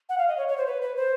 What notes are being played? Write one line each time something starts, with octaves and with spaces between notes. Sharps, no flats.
F#5
F5
D#5
C#5
C#5
C5
B4
B4
C5